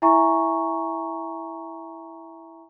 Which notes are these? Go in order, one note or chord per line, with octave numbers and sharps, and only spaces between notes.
E4 E5 G#5 A#5 C#6